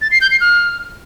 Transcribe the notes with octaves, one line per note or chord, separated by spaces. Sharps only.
A6
C7
G6
C7
F6